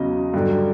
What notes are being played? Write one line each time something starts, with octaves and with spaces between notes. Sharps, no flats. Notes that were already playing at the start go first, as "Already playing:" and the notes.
Already playing: E2 C#3 F#3 D#5
G2 D3 F#3